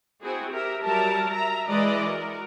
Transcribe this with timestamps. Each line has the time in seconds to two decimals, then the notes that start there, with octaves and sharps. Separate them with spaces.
0.22 C4 E4 F#4 G#4
0.53 G4 A#4 E5
0.84 F#3 G3 G4 A#4 E5 A5
1.30 E5 A#5
1.69 E3 G#3 B4 D5 D#5
2.05 F#4 A#4